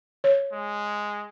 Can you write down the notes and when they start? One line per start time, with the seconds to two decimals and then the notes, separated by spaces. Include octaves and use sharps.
0.24 C#5
0.52 G#3